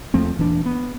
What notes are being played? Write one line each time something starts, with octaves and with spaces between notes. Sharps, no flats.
E2 F3 A3 C4
D#1 E3 D4
B3